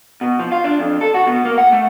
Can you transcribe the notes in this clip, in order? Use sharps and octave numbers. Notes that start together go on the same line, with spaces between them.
B2
F3
F4
D4
F2
A4
F#4
B2
A#3
F#5
A3